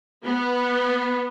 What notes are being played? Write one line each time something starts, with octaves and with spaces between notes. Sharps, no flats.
B3